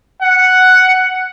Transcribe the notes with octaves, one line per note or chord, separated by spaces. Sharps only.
F#5